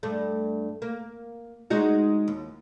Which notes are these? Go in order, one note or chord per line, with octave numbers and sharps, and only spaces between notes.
G2 A3
A#3
G#3 D#4 F#4
D#2